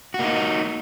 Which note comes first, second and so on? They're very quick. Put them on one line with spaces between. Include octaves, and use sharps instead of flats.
F#4 A#3 D#4